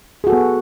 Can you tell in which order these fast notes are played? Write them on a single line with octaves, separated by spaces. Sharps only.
G#4 F#4 A4 B3